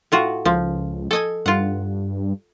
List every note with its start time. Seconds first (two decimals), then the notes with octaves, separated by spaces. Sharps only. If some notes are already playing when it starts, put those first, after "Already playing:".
0.12 A2 F4 F#4
0.45 C#2 F3
1.11 A4 D#5 G#5
1.46 G2 F4 F#5